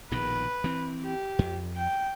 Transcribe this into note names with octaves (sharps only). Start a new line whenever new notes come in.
A#1 B2 D#3 B4
E3 C4
G4
F2
G5